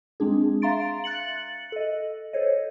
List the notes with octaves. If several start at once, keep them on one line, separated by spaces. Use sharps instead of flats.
G#3 C4 D4 G#4
E5 F5 A#5 C6 A6 D7
F#6 A6 C#7 F#7
A4 D#5
A4 C5 C#5 D#5